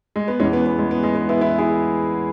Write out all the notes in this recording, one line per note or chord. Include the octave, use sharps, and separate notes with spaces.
G#3
B3
E2 E3 G#3 C#4
B3
B3
G#3
B3
G#3
B3
B3 E4
B3 E4
E4 G#4